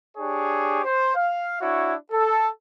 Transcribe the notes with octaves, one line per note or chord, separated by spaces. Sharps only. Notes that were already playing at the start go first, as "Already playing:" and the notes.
D4 G4 G#4 C#5
C5
F5
D4 E4 F#4 C#5
A4